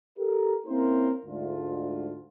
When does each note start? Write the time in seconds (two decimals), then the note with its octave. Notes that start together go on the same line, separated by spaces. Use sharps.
0.18 G4 A4 A#4
0.67 A#3 C4 C#4 E4 A#4 C5
1.25 D2 G#2 F4